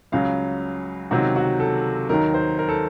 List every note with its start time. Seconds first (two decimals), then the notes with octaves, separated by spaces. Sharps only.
0.12 C#2 C#3 F#3 F5
1.11 C#2 C3 D#3 F#3 F#4
1.36 F#4
1.60 A4
2.09 D#2 D#3 F#3 A#4
2.34 C5
2.59 A#4
2.69 A4